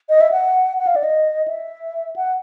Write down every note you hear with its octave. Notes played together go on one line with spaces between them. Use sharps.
D#5
E5
F#5
F#5
F5
D5
D#5
E5
F#5